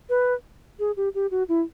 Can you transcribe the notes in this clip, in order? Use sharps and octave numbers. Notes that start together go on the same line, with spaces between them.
B4
G#4
G4
G4
F#4
E4